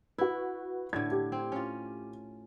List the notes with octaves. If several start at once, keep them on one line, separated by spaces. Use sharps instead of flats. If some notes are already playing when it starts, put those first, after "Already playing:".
E4 F#4 B4
A2 D3 G#6
G4
C4
C#4 F4